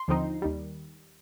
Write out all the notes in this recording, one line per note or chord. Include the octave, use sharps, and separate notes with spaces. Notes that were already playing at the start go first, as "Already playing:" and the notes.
Already playing: C6
D#2 D3 F3 C4 D#4
D#2 D#3 G3